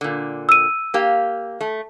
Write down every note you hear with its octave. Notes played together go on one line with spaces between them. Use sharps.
A#2 D3
E6 D#7
A#3 G4 F5
A3